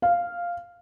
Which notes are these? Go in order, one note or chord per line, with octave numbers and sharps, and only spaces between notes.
F5